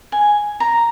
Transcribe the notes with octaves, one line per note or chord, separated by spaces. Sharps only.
G#5
A#5